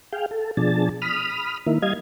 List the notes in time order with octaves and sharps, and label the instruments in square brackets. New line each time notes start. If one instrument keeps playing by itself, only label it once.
[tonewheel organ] G#4 F5 G5
A4
B2 F3 D4 G#4 A5
B5 D#6 F6
D#3 A#3 E4
G3 D#5 F5 G#6